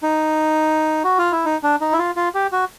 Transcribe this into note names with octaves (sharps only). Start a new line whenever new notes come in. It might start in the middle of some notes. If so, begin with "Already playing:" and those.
D#4
F#4
F4
E4
D#4
D4
D#4
E4
F4
F4
G4
F#4